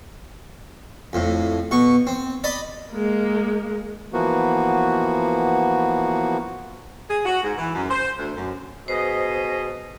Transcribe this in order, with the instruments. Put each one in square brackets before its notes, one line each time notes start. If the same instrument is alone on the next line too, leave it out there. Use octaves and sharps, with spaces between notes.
[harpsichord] F2 A2
B2 C#6
C4
D5 D#5 B5
[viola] G#3 A#3
[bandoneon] E3 F3 A#3 B3 F#4
[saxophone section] G#4
F#4
G#2
E3
F#2
C5
D2
F#2
[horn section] B2 G#4 D#5 [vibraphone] C5